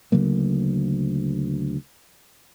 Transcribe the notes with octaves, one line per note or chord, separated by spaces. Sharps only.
D2 C#3 F#3 A#3